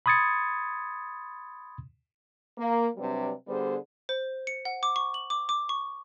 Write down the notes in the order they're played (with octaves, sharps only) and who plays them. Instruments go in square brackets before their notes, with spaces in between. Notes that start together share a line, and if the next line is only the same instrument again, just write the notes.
[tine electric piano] B5 C6 D#6 G#6 A6 C#7
[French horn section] A#3
C3 F#3 G3 D4 B4
D3 G3 B3 G#4 C5
[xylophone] C5
C#7
F#5
D6
C#6
F#7
D6
D6
C#6